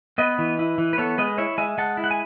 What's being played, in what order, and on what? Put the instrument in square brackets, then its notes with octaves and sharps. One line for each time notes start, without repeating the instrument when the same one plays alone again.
[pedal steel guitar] B3 B4 D#5
E3
E4
E3
B4
B3 A4 C#5
G#3 B4 D#5
E4 C#5 E5
G#3 E5 G#5
G#3 F#5 A5
E4
F#5
G#5